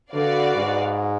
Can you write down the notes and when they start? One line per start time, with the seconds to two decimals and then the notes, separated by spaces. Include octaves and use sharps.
0.12 D3 F#4 B4 D5 F5
0.55 G#2